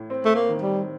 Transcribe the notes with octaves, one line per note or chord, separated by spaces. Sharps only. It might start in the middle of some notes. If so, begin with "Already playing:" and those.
Already playing: A2
C4
A3
A#3
D#3
G3